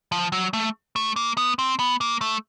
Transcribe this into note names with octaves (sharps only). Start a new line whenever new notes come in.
F3
F#3
A3
A3
A#3
B3
C4
B3
A#3
A3